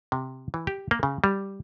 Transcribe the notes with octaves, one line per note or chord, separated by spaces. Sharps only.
C3
E3
G4
A#3
C#3
G3